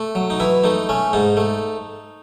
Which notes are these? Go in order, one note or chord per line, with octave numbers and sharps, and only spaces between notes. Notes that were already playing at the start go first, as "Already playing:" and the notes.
Already playing: A3
F#3
D#4
E3 E4
A3 D#4
A3 C#4
G#2 D#4
A3